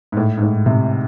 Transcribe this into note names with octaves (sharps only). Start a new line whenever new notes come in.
G#2
A2
G#2
A2
C3